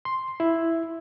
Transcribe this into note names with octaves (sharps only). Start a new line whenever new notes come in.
C6
E4